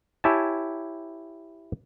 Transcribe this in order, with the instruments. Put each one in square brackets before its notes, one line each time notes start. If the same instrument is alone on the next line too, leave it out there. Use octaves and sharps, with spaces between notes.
[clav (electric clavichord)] E4 G4 C#5 G#5 A5